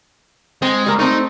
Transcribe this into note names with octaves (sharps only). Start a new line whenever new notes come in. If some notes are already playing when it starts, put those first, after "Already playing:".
G#3 C4
G3 A#3
A3 C4 D#4